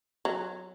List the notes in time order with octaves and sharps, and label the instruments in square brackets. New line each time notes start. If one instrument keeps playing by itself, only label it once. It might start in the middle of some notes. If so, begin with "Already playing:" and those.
[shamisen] F#3